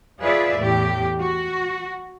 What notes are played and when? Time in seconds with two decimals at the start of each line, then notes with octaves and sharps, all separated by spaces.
0.21 F4 G#4 B4 D5 E5
0.60 E2 A2 G4
1.21 F#4